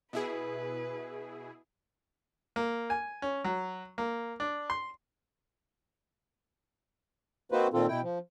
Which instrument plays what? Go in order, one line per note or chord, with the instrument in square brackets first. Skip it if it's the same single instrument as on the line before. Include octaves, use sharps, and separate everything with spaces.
[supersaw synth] B2 E4 G#4 [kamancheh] B4
[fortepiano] A#3
G#5
C#4
F#3
A#3
D4
C6
[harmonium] A#3 C4 D#4 F#4 B4 C5
A#2 D#3 C4 F4 A4
B2 E4 G5
F3